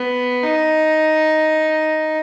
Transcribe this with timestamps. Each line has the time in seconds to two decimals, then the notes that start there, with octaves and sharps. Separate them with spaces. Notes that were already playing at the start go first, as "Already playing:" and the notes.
Already playing: B3
0.43 D#4